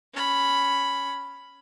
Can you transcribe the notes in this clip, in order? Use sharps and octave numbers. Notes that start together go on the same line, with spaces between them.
C#4 B5